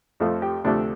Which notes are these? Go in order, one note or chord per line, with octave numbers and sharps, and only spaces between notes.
F2 F3 A3
G4
D2 C3 F3 A3 D4